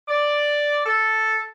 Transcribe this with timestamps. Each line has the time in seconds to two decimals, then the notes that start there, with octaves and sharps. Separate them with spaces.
0.08 D5
0.86 A4